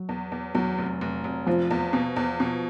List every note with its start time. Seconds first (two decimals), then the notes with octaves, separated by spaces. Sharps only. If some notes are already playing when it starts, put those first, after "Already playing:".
Already playing: F#3
0.09 E2
0.32 E2
0.54 E2 F#3
0.78 F1
1.01 F1
1.24 F1
1.46 F1 F3
1.71 E2
1.93 B2
2.16 E2
2.40 B2